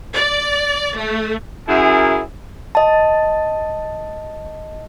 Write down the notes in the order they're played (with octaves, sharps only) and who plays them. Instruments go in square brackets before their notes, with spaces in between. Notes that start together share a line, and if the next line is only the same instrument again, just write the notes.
[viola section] D5
A3
[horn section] F#2 E4 G#4
[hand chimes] D#5 A5